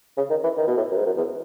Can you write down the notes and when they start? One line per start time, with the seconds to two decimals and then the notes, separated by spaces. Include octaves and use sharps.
0.17 C#3
0.30 D#3
0.43 E3
0.57 D#3
0.67 B2
0.77 A2
0.91 F#2
0.97 G#2
1.06 F#2
1.17 E2